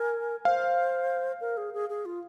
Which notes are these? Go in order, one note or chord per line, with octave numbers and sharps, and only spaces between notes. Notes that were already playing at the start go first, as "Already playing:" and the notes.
Already playing: A#4 G#5
C5 F5
A#4
G#4
G#4
G#4
F4